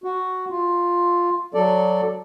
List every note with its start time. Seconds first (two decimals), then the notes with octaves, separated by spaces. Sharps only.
0.04 F#4
0.50 F4
1.54 F#3 A4 D5